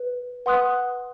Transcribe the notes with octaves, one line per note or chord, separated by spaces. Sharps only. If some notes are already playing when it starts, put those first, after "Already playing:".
Already playing: B4
B4 F#5 C6 D#6 F#6